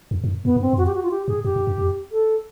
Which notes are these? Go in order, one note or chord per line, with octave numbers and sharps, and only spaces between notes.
F2
G2
F#2
F#2 B3
F#2
G2 C4
F#2
F2 F#4
G4
F#4
F4
G4
G2 G#4
F#2 G4
F#2
F#2
F2
A4